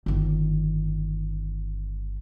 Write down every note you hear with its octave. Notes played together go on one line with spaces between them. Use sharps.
G1 D#3